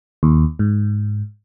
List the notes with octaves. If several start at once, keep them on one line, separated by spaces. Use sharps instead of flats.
D#2
G#2